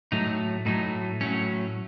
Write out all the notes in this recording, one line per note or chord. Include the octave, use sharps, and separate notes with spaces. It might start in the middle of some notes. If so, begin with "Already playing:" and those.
A2 F#3 A3 D#4
A2 F#3 A3 D#4
A2 F#3 A3 C#4